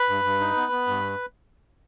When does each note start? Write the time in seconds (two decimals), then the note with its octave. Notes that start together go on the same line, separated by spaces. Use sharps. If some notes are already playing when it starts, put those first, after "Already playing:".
Already playing: B4 B5
0.09 G2
0.24 G2
0.40 D#4
0.56 B3
0.72 B3
0.87 G2